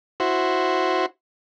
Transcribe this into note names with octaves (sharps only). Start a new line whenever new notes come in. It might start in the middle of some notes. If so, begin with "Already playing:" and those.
E4 F#4 C5